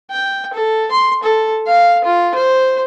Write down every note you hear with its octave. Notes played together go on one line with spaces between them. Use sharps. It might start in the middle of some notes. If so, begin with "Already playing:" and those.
G5
A4
C6
A4
F5
F4
C5